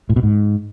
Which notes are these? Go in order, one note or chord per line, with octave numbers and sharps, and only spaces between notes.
A2
B2
G#2